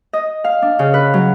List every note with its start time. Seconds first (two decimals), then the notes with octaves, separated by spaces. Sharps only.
0.13 D#5
0.44 F5
0.62 D4
0.79 C#3
0.94 B4
1.14 F#3